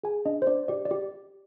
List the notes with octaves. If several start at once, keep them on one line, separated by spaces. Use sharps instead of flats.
G#4 G#5
D4 D#5
C5
D4 D5
G4 D5
D5
G4